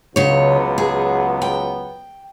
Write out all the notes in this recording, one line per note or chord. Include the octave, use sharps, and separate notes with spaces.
C#2 C#3 F#3 B3 C#5
G#4
G5